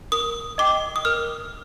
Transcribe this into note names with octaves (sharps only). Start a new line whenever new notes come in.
A#4 D#6
D#5 G5 D6
D#6
A#4 F6